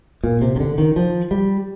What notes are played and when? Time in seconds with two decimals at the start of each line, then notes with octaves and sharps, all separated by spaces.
0.24 A#2
0.42 C3
0.56 C3
0.60 D3
0.78 D#3
0.96 F3
1.31 G3